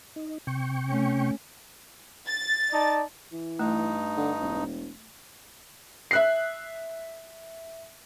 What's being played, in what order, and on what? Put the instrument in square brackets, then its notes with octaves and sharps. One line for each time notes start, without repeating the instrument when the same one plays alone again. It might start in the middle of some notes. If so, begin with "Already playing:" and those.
[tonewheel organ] D#4
C3 G5 C#6
[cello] A3 C#4
[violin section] A6
[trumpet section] D#4 D5 A5
[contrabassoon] E3
[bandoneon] G2 D#4 [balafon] A3
[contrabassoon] D3
E1
[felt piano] E5 F#6 C7